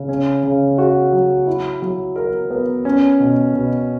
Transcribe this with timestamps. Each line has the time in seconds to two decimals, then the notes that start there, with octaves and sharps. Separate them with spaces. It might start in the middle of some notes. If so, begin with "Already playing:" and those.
Already playing: C#3
0.09 C#4
0.43 C#3
0.78 F#4
1.13 F#3
1.47 E4
1.82 F#3
2.16 A#4
2.50 B3
2.85 C#4
3.20 B2
3.54 B2